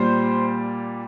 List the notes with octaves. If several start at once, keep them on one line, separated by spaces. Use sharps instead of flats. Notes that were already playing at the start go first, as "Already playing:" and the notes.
Already playing: A#2 G3 C5